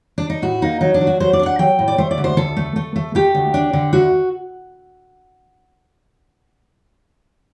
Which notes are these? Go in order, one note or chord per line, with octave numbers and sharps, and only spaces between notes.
D4
D#4
A2 F#4
A#3 D#4
F#3 D#4
D4
F#3
F#4
F#3 C5
D5
D4
F#5
F#3 G5
A2
D5
A3 C5
D5
D2
C5
D2 A4
A3
A3
A3
A3 G4
D2
D4
D3
D2 F#4